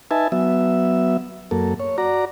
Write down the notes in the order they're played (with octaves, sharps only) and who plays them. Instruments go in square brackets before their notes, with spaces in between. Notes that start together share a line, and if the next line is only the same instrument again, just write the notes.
[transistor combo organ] D#4 B4 E5 G#5 A5
F#3 B3 E5
F#2 A#3 A4
C#5
F#4 D5 A#5